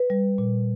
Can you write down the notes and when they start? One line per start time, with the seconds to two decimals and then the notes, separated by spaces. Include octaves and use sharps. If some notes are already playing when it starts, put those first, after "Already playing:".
Already playing: B4
0.10 G3
0.38 A#2